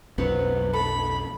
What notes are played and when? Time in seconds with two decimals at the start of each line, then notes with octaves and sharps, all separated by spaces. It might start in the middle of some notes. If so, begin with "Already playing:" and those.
0.18 B1 F2 F#3 B3 C#4 C5
0.73 A4 B5